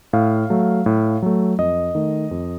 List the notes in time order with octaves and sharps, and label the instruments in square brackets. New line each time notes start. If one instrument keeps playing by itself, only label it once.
[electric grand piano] A2 F5
F#3 A3
A2
F#3 A3
F2 D#5
D#3 A3
F2